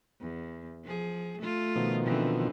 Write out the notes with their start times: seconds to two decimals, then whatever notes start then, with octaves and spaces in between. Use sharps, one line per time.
0.21 E2
0.84 F3 G#4
1.38 A3 F4
1.76 B2 D#3 F3
2.05 D3 E3 C4